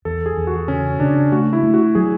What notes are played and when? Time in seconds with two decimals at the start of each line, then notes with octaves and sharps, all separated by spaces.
0.05 E2 A4
0.26 G#4
0.37 E2
0.47 F#4
0.68 C#3 C#4
1.00 C#3 D4
1.32 A3 F#4
1.53 E4
1.63 A3
1.74 F#4
1.95 F#3 G#4